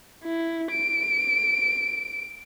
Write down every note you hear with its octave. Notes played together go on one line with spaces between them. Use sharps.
E4
D7